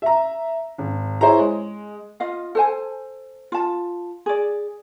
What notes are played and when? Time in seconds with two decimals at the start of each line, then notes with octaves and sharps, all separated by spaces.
0.02 E5 A#5
0.78 G#1
1.21 E4 G#4 C5 C#5 E5 A#5
1.39 G#3
2.20 F4 D#5 F5
2.55 A4 C5 G#5
3.52 F4 A5
4.26 G#4 D5